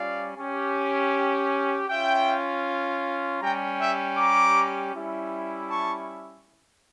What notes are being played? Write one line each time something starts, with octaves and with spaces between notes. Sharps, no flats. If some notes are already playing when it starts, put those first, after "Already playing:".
Already playing: G3 C#4 F4 D5 F5
C#4 G4
C#4 F4 E5 G5
G3 C#4 G4 G5 A#5
E5 G5
A#5 D6
G3 C#4 E4
A5 C#6